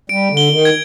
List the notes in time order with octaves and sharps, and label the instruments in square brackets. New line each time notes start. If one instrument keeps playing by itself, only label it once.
[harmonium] G3 [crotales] D7
[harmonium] D3
[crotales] G7
[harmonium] D#3
[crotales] G#6